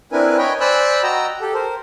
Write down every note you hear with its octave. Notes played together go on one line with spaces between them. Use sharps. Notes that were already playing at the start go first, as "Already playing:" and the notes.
C4 D4 E4 A#4 B4 G#5
C#5 D#5 G5 G#5 B5
C5 D5 G#5 B5 E6 F#6
F#4 D#5 G5 A#5 E6
G4 A4
A#4 C5